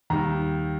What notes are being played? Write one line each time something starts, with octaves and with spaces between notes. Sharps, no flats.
D#2 D#3 G3 A#5